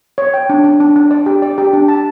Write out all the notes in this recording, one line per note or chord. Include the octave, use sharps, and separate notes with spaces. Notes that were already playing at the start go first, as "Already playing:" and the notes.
C#5
G5
D4
D4
D4
D4
D5
G4
D5
G4
D4
A5